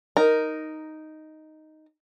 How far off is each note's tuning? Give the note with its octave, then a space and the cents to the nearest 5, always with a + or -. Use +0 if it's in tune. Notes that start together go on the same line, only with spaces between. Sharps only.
D#4 +0 A#4 +0